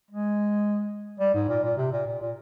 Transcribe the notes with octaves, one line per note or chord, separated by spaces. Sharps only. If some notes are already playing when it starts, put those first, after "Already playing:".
G#3
G3
G#2
A#2
A#2
C3
A#2
A#2
A#2